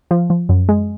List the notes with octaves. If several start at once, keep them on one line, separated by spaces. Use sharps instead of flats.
F3
F3
F#2
G#3